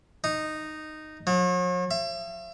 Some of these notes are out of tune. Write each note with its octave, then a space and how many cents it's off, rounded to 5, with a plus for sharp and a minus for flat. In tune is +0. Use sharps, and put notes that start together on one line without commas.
D#4 -10
F#3 -45
E5 +40